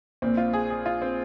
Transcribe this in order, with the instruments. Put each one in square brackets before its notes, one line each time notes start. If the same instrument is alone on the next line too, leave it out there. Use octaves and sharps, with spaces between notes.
[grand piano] A#1 A#2 [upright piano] C4
[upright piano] F4
G#4
G#4
F4
C4